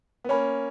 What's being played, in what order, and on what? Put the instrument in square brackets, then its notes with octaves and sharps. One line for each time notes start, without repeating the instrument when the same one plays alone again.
[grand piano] B3
[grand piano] A#3 C#4 [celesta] C#5 G#5 B5